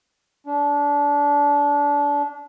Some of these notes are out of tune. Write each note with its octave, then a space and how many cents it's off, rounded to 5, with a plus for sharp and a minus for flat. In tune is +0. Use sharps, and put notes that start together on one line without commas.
D4 -25